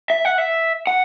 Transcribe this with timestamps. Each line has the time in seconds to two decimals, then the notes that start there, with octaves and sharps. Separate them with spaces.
0.10 E5
0.25 F#5
0.38 E5
0.87 F#5